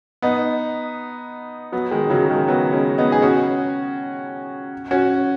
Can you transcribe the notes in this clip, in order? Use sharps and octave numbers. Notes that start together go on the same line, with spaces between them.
B3 D#4
F#3 B3
D#3 G#3
C#3 F#3
D#3 G#3
F#3 B3
G#3 C#4
B3 D#4
G#4
C#4 F#4
C#4 F#4